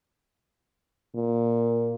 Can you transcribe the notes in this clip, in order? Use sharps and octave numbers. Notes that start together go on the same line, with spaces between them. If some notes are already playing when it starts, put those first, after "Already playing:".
A#2